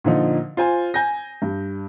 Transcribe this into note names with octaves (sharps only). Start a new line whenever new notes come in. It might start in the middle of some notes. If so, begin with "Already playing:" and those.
A#2 D3 F3 D#4
F4 C5 G#5
G#5 G6 A#6
G2